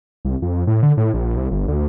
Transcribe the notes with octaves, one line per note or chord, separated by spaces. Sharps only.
C2
F2
A2
D3
A2
A#1
C2
G1
D2